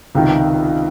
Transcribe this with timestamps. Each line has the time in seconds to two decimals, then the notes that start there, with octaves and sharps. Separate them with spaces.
0.15 C#2 C3 D#3